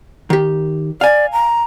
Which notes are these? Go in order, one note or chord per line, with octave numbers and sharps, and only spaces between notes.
D#3 G4
D5 F5 G#5
A#5